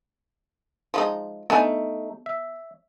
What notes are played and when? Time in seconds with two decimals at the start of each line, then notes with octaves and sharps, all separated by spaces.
0.94 F3 G#3 D#4
1.50 A3 B3 D4 D#4 G#5
2.26 E5